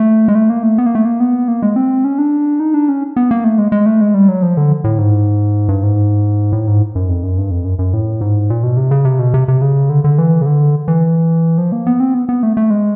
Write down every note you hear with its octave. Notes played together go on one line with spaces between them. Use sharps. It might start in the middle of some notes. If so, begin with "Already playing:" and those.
Already playing: A3
G#3
A3
A#3
A3
B3
A#3
A3
A#3
B3
A#3
G#3
C4
C#4
D4
D#4
D4
C#4
B3
A#3
A3
G#3
G#3
A3
G#3
G3
F#3
F3
D3
A2
G#2
G2
G#2
A2
G#2
F#2
F2
F#2
G2
F2
F#2
F#2
A2
G#2
A#2
B2
C3
C#3
C3
B2
C3
C3
C#3
D3
D3
E3
C#3
D3
E3
F3
A#3
B3
C4
B3
B3
A3
A3
G#3